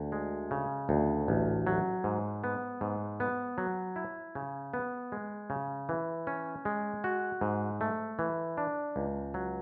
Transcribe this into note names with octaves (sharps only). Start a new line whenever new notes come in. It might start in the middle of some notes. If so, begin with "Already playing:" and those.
Already playing: D2
G#3
C#3
D2
A1
F#3
G#2
B3
G#2
B3
F#3
E4
C#3
B3
G#3
C#3
E3
C#4
G#3
F#4
G#2
A3
E3
D4
C#2
F#3